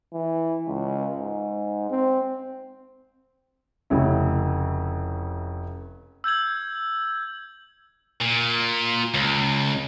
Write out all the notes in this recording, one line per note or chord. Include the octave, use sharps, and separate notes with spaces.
E3
C#2
G#2
C4
F1 C#3 E4
E6 G6 G#6 F#7
A#2
C#2